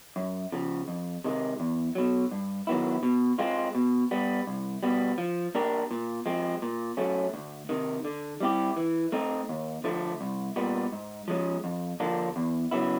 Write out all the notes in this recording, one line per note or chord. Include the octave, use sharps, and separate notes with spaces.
F#2
C#3 F3
F2
C3 D#3 G#3
E2
B2 F#3
G2
D#3 F#3 B3 E4
B2
G#3 C4 F4
B2
G3 B3
C2
B2 G3 B3
F3
A#3 D4 G4 A#4
A#2
F3 G#3 C4
A#2
F#3 A3 C#4
D2
C3 D#3
D3
G3 C4 E4 G4
E3
A3 C4 D#4
D#2
D3 F3 A3
C2
A#2 G3 B3
G#2
F3 G#3 C#4
F2
D3 F3 A#3 D4
E2
C#3 F#3 B3 E4